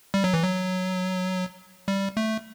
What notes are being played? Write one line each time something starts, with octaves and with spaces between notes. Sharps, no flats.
G3
F#3
E3
F#3
G3
A3